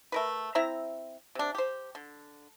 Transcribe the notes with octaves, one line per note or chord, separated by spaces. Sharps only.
A3 A#4 B4
C4 E4 E5 A#5
C3 D4
G4 C5
D3